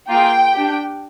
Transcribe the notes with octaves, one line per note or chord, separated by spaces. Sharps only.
A#3 F4 G#4 G5
D4 G4